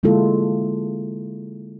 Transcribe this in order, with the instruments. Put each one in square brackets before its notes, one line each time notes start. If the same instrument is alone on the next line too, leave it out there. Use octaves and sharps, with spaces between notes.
[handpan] D3 G#3 A#3 E4 F4 A4